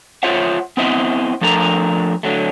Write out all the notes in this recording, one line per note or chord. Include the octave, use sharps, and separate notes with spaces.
F4 C5 C#5 E5 F#5
B3 C4 E4 C5 D#5 E5
F3 A3 D4 A4 A#4 A#5
D3 F#3 A3